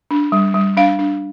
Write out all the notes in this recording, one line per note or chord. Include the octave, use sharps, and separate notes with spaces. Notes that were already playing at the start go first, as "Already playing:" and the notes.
D4
G3
G3
D4 F5
D4